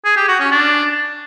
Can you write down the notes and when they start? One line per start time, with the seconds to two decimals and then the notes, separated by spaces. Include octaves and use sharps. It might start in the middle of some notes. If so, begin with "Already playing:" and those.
0.05 G#4
0.17 G4
0.28 F#4
0.40 C#4
0.51 D4